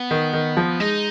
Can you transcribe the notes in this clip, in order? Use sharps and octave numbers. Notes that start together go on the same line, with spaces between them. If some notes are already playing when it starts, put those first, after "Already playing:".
Already playing: B3
D#3
D#3
F3
G#3 D#4